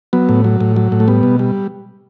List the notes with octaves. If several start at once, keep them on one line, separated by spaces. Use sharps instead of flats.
F#3 B3
A2
F#3
A2
F#3
A2
A3
G3 B3
B2
G3